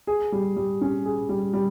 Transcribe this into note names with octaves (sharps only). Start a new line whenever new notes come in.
G#4
G3
G3
C#4
G#4
G3
G3